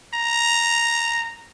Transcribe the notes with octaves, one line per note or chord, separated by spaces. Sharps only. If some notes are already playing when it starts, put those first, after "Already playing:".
A#5